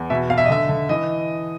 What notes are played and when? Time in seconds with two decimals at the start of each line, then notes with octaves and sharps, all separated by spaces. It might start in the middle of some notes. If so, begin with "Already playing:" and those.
Already playing: E2
0.10 B2 E5
0.30 B2 F5
0.38 E5
0.45 D#5
0.50 D3 E5
0.69 D3
0.89 E3 D#5